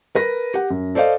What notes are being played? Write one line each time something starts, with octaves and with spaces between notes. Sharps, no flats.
A#4 B4 A#6
G4 F#5
F#2
A4 C5 D5 D#5 F5